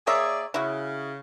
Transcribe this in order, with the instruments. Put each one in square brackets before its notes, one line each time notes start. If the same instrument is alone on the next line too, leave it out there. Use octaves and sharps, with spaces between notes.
[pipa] A#3 C#5 E5 [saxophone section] G#4 D5
[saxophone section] C#3 [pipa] E4 F#4